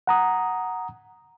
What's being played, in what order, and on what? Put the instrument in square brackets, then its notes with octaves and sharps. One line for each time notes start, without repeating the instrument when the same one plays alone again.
[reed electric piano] F#5 A#5 D#6